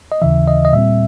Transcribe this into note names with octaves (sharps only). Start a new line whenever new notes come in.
D#5
D#2 C#3 E3 E5
D#5
D#5
A#2 G3 C4 E5